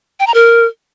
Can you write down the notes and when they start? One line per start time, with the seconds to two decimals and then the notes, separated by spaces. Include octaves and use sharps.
0.20 G5
0.27 A#5
0.34 A#4